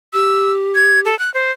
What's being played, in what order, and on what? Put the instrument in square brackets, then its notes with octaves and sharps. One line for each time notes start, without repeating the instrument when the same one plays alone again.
[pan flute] G4 [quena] E6
[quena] G#6
A4
F#6
C5